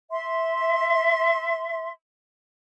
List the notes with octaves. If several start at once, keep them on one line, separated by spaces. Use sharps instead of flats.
E5 C6